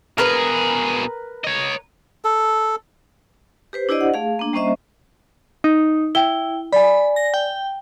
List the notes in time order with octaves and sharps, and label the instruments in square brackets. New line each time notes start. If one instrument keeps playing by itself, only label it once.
[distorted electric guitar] B2 G#4 [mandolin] A#4 B4
[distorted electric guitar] C#5 D#5
[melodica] A4
[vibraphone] G4 B4 C5
D4 E4 G4 C5 D5 D#5
F#5
A3 G#4 F5
A#3 D4
G3 A#3 C#4 C5 D#5 E5
[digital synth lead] D#4
[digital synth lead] E4 [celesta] G5 G7
[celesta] D5 G#5 [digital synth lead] B5
[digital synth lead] A#6
G5